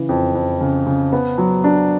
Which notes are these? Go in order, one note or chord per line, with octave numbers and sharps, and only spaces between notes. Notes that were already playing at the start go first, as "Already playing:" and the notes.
Already playing: C#3 E3
F2
F2
C#3
C#3
B3
F#3
D4